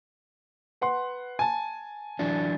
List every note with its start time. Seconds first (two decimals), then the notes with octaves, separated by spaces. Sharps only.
0.81 B4 F#5 C6
1.39 G#5 A5
2.19 E3 F#3 D4